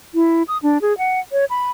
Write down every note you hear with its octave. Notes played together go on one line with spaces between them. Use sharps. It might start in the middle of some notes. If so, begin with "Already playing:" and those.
E4
D#6
D4
G#4
F#5
C#5
B5